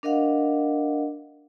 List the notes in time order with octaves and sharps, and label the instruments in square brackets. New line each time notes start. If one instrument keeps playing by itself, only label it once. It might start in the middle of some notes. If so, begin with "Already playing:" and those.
[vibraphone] D4 A#4 D#5 F5 F#5